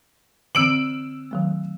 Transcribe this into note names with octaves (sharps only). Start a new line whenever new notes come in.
D3 E3 C4 E6 D7 F#7
D#3 F#3 A3